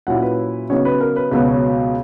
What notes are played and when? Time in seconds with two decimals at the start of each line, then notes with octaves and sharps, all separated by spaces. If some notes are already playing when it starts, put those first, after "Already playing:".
0.07 A#2 F#3 C#4 E4 F#5
0.22 B4
0.70 C#3 F#3 B3 D#4 C#5
0.85 B4
1.01 A#4
1.16 B4
1.31 C#2 B2 F#3 B3 B4
1.48 C#5